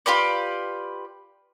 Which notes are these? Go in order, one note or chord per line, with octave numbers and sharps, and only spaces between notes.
F4 G4 B4 D5